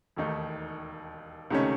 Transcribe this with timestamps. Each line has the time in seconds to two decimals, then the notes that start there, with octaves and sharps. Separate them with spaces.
0.16 E1 D#2 D#3 A3 D#4
1.50 C#2 C3 D#3 A3 C#4